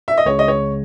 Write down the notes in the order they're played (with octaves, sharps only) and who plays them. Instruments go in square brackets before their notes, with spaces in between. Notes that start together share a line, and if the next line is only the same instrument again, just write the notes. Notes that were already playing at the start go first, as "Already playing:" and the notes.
[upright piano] E5
D#5
[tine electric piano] C#2 C#3 G#3 [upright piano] C#5
[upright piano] D#5
C#5